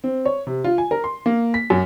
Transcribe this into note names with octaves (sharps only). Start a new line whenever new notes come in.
C4
C#5
C3
F4
G#5
A#4
C6
A#3
B6
F#2